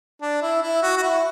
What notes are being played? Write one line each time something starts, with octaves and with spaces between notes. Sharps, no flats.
D4
E4
E4
F#4
F#4
E4